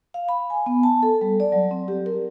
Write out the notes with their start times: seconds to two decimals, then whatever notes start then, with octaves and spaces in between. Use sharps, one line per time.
0.14 F5
0.29 B5
0.50 G#5
0.66 B3
0.83 A5
1.03 A4
1.21 G3
1.40 D5
1.52 F#3
1.71 C4
1.88 G4
2.06 A#4